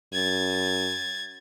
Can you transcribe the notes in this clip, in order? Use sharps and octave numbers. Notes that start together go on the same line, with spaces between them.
F#2 G#6 A6